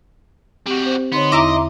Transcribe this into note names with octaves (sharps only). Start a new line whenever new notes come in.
G3 C4 F#4 G4
C4 C5
D3 B3 D#4 C#5 C6
E2 E4 D#5 E5 A#5 D6